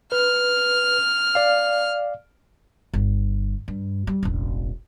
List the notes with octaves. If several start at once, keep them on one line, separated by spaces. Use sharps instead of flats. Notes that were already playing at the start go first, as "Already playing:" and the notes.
B4 F6
D5 F5
G1
G2
G3
E1 A1